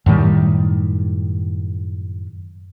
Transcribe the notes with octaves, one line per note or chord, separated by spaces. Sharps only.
F#2 A2 D#3 G3